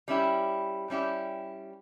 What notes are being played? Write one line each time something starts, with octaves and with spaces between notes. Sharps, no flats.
G3 C#4 E4 G4
G3 C#4 E4 G4